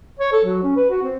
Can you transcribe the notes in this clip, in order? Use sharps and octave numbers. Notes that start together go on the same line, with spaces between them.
C#5
A4
F#3
C#4
B4
F#4
C4